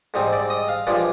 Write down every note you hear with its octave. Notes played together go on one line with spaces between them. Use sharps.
G#2 G3 C4 D#4
D5
D#5
F5
G2 F3 G#3 D5